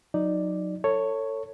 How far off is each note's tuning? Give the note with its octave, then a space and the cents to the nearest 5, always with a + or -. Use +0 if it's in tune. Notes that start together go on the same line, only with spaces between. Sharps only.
F#3 -25 D#4 +0 D5 +0
A4 +30 C#5 +0